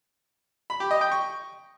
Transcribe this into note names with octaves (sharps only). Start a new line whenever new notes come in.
B5
G4
D#5
G5
C#6